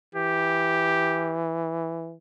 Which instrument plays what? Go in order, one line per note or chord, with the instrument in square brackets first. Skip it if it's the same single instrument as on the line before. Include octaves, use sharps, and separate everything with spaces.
[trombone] E3 [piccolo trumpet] G4